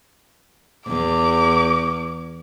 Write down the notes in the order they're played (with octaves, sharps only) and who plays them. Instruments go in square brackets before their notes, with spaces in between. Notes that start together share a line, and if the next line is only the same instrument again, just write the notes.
[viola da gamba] E2 [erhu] D6